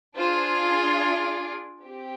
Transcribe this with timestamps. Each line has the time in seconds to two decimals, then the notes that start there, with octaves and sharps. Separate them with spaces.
0.16 D4 F4 G#4 C5
1.00 D5
1.84 C4 G4